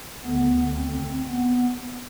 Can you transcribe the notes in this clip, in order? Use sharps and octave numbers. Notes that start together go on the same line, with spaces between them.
D2 D3 B3
C4
B3